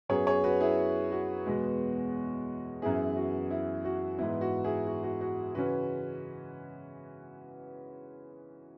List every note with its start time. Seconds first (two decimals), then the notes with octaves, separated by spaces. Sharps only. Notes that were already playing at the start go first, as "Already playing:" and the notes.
0.09 F#2 F#3 B3 G#4 C#5
0.27 G#4 C#5
0.44 F#4 B4
0.60 E4 G#4
1.12 F#4
1.46 E2 B2 G#3 B3
2.82 F#2 E3 B3 E4 G#4
3.16 F#4
3.51 E4
3.85 F#4
4.18 G#2 E3 B3 E4
4.41 F#4
4.64 E4 G#4
4.87 F#4
5.03 F#4
5.21 F#4
5.55 C#3 E3 C#4 F#4 B4